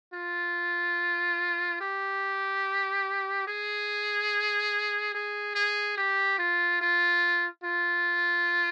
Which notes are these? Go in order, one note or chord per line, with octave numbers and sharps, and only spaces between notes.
F4
G4
G#4
G#4
G#4
G4
F4
F4
F4